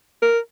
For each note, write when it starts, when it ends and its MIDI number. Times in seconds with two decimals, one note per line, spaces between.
0.22 0.39 70